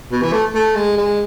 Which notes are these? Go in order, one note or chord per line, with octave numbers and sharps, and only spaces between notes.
B2
E3
A3
A3
G#3
G#3